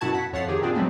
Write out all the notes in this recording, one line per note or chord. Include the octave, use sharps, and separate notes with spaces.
F#2 B2 E4 F#4 A5 G#6
F#5 B6
F2 C#5 E5 F#5 A6 C7
D#3 G4 G#4
A#2 C4 D4 F4 G#4
F#3 G#3 A3 B3 C4